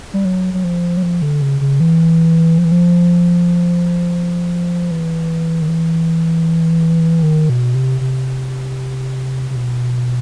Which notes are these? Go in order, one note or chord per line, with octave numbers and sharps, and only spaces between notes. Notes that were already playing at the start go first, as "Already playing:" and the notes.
G3
F#3
F#3
F3
F#3
F3
D3
C#3
C#3
E3
F3
E3
F3
E3
D#3
E3
D#3
B2
C3
C3
C3
B2